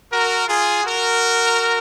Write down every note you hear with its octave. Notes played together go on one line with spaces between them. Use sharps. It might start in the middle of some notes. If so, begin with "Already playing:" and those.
F#4 A#4
F4 G#4
F#4 A#4